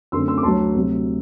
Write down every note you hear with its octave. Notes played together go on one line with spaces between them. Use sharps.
F#2 D3 A3 C4 C6 E6
C6 E6
D6
D2 D3 F#3 A5 C6
D2 C3 F#3